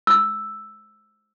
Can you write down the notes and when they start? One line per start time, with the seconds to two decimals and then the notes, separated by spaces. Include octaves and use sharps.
0.07 E6